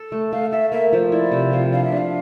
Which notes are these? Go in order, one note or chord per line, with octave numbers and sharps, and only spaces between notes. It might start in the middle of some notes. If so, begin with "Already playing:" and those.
Already playing: A4
A3
A3 F5
A4 E5
A#3 E5
F3 C5
E4 D5
C3
F3 F5
D4 F5
E5
D4
F5